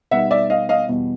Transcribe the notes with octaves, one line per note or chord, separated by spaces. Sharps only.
B2 G3 B3 D#4 E5 F#5
D5 E5
D#5 F5
D#5 F5
E2 B2 G3